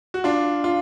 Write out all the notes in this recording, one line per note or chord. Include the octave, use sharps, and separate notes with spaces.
F#4
D4 F4
F4